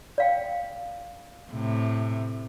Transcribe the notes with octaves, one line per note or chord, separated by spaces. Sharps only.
D5 F5 G5
A2 C3